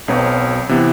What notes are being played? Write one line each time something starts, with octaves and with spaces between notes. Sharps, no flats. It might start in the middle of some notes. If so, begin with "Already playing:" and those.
B1 B2 F#3 C4
C3 E3 B3